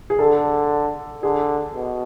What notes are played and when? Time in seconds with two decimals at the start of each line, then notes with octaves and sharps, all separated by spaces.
0.10 G#4
0.19 D3 A4
1.23 D3 G#4
1.75 B2